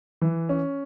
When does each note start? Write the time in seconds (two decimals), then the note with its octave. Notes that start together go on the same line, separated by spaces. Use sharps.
0.21 E3
0.49 C#4